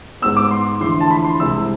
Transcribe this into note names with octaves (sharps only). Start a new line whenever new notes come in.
G#2 G#3 B3 E6
D6
C6
E2 D3 F3 A3 E4 C6
A5
B5
C6
C2 C3 G#3 E6